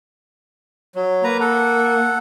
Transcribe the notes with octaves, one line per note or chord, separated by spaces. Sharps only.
F#3
A#3 B4 A#5
A4 F#5